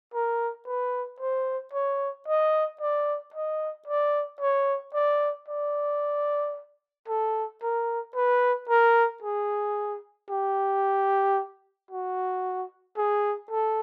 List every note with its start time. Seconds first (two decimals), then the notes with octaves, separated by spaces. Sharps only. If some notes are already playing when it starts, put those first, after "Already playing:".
0.14 A#4
0.67 B4
1.21 C5
1.74 C#5
2.28 D#5
2.81 D5
3.34 D#5
3.88 D5
4.41 C#5
4.95 D5
5.49 D5
7.08 A4
7.63 A#4
8.16 B4
8.70 A#4
9.23 G#4
10.30 G4
11.91 F#4
12.97 G#4
13.51 A4